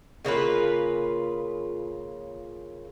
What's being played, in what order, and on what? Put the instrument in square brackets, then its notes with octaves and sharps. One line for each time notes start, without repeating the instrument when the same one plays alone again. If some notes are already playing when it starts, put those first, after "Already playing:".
[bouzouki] C#3 A#3 F4 B4